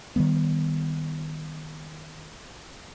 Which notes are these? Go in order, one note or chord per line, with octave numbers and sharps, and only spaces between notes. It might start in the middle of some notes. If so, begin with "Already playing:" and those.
D#3 F3 G3 B3